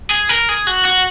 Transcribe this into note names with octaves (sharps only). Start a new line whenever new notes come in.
G#4
A#4
G#4
F#4
F#4